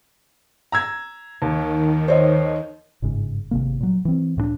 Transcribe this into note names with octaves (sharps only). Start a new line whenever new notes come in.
A#5 E6 G#6
D#2 D#3
C5 C#5 D#5
G1 G#2 C#3
G#1 C3 A#3
A#2 F#3
E3 C4
C#2 A2 G#3 D4